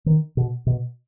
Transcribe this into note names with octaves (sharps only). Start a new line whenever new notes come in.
D#3
B2
B2